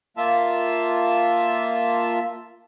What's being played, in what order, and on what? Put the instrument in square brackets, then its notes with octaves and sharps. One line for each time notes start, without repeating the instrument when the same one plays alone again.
[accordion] A#3 F4 E5 A5